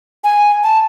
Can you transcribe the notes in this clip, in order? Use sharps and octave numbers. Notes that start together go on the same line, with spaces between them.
G#5
A5